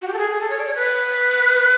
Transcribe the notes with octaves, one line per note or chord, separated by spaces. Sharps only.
F#4
G4
A4
G#4
G#4
A4
C#5
D5
C#5
B4